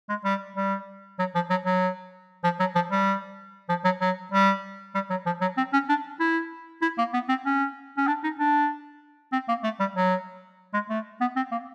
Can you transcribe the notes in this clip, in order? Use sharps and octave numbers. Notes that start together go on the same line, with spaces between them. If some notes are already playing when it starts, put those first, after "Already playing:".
G#3
G3
G3
F#3
F3
F#3
F#3
F3
F#3
F3
G3
F3
F#3
F#3
G3
G3
F#3
F3
F#3
C4
C#4
D4
E4
E4
A#3
B3
C4
C#4
C#4
D4
D#4
D4
C4
A#3
A3
G3
F#3
G#3
A3
B3
C4
A#3